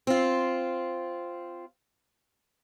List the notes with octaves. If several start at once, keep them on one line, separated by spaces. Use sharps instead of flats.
C4 F4